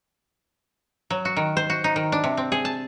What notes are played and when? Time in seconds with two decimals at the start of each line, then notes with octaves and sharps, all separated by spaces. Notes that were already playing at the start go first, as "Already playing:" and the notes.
1.10 F#3
1.25 F#4
1.36 D#3
1.57 C5
1.70 F#4
1.84 D#4
1.96 D#3
2.12 D4
2.24 C3
2.37 C4
2.52 G#4
2.65 A5